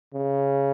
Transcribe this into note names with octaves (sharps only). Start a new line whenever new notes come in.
C#3